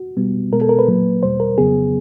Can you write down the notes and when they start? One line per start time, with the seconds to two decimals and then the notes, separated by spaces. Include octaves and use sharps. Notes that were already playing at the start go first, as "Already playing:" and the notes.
Already playing: F#4
0.17 B2 G3 B3
0.52 B2 G#3 B3 A#4
0.61 A4
0.69 A#4
0.79 B4
0.87 A#2 F#3 A#3
1.23 E2 B2 G3 C5
1.40 A#4
1.58 F2 C#3 F#3 B3 G#4